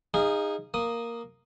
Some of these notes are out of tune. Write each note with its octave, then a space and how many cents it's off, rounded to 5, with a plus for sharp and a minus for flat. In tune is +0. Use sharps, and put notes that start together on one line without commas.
D#4 +0 G#4 -25 F5 -25
A#3 +0 D#6 +0